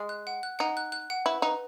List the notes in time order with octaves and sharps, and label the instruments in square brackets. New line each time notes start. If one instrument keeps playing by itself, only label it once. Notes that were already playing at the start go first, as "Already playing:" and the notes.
Already playing: [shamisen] G#3
[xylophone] F#6
F#5
F#6
[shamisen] D#4 [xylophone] F#5
[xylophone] F#6
F#6
F#5
[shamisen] E4 [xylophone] B4
[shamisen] D#4 [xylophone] B4